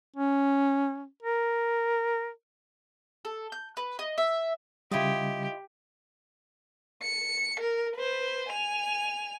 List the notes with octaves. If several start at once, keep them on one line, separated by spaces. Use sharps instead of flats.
C#4
A#4
A4
G6
B4
D#5
E5
C#3 G3 E4 F4 G4 D#5
C#7
A#4
B4 C5
G#5 F7